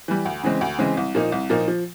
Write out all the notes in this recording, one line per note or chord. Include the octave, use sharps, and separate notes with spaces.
E3 G3
D2
C#3 E3 G#3 C4
D2
C#3 E3 G#3 C4
C2
A#2 F3 A#3 D#4
C2
A#2 F3 A#3 D#4
F3